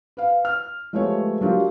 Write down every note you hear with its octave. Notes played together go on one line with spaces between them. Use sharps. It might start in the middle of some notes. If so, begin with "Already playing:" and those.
B4 F5
F6
F3 G#3 A3 B3 G4 C#5
F#3 D4 F4 G4 A#4